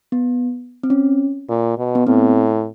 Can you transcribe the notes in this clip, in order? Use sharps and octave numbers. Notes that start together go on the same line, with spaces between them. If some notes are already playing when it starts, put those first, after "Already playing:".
B3
C4
C#4
A#2
B2
B3
A2 C4